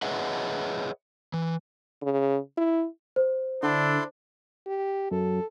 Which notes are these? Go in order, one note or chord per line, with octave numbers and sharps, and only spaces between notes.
G#4 B4 C#5 D#5 E5 F#5
E3
C#3
E4
C5
D3 D4 E4 A4 C6
G4
F#2 A4